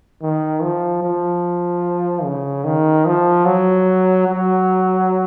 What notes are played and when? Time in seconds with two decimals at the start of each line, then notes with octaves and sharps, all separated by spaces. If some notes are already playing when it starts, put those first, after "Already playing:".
0.22 D#3
0.62 F3
1.03 F3
2.24 C#3
2.65 D#3
3.06 F3
3.45 F#3
4.27 F#3